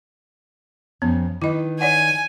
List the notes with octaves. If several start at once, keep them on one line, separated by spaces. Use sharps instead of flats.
F2 B3 C#4
D#3 E4 B4 D#5
C#5 D5 F#5 G#5